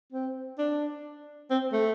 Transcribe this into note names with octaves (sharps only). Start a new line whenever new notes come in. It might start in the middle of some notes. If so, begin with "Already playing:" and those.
C4
D4
C4
A3